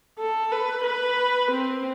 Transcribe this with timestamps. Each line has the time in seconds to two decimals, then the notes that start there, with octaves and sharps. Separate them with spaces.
0.18 A4
0.52 B4
0.84 B4
1.51 C4